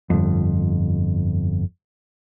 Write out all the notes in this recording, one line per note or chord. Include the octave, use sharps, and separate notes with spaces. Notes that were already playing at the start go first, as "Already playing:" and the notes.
G1 F2